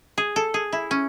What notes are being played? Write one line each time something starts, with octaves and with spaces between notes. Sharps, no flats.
G#4
A4
G#4
E4
C#4